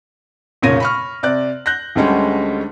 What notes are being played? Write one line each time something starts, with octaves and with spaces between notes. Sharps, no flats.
F1 A#2 C#3 C#5 A#6 D#7
B5 C#6 F6
C3 D5 F#6
F#6 G6 A#6
D2 D3 G3 G#3 C#4